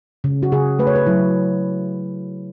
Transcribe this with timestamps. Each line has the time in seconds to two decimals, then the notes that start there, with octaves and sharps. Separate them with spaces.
0.24 C#3
0.43 F#4
0.52 C#3 G#4
0.79 A3 B4
0.87 C#5
0.96 B4
1.06 F#3 E4